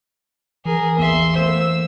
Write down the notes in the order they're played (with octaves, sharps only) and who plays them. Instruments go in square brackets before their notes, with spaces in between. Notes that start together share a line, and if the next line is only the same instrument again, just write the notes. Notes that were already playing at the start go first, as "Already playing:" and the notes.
[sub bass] E3 [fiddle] G#4 A#4
[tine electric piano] A1 E2 A#3 [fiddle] E5 C6
[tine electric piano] A3 A#3 C5 [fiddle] E6